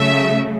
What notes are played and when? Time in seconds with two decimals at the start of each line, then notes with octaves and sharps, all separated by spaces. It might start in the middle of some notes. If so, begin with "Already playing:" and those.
Already playing: C#3 F#3 A3 E5